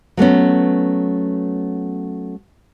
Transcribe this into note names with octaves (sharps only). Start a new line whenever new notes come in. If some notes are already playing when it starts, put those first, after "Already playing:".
F#3 A3 B3 C#4